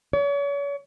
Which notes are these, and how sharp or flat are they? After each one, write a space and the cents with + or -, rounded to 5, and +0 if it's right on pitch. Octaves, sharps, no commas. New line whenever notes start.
C#5 +40